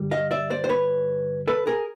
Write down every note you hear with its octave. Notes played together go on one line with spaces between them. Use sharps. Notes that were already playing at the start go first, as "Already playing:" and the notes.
Already playing: G2 D3 G3
D#5 F5
D5 E5
C5 D5
C5
B4 C#5
A4 B4
G#4 A#4